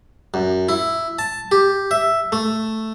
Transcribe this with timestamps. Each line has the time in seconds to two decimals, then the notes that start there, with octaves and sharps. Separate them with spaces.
0.34 F#2
0.69 E4
1.19 A5
1.52 G4
1.91 E5
2.32 A3